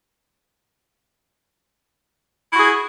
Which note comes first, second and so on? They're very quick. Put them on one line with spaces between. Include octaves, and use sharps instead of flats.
E4 F#4 G#4